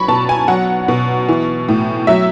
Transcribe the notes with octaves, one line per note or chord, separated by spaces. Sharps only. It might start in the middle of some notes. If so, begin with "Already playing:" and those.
Already playing: F#3 B5 C#6
B2 A5
G#5
F#3 F#5
B2
E3
A2
F#3 E5